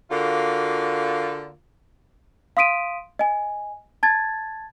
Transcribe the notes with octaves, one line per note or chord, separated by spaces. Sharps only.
D3 A#3 F4 F#4
F5 C6 D#6 B6 D7 D#7
D#5 G#5
A5 G#6 A6